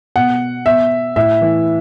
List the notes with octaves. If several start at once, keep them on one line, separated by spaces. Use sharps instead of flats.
B2 F#5
B2 E5
A2 E5
E3